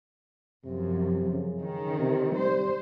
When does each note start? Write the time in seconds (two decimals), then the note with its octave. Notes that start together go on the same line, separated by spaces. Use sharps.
0.65 F#2 C3 F3
1.30 C#3
1.61 D#3
2.00 C3
2.35 G3 C5